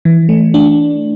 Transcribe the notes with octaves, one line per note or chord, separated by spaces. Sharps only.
E3
A3
D4